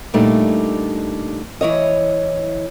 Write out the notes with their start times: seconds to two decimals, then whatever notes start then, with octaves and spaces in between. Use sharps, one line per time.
0.14 A#2 G3 A3 D4 D#4
1.61 E3 E4 C#5 D#5